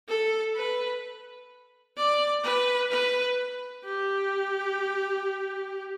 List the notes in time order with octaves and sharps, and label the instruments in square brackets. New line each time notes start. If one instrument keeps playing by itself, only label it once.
[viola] A4
B4
D5
B4
B4
G4